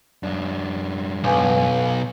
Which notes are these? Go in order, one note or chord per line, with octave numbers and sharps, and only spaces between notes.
F#2 D4
B1 B4 F5 G#5